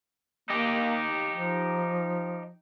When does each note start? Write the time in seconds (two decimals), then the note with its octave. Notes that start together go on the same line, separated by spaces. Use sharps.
0.50 A#3 D#4 G4
1.33 F3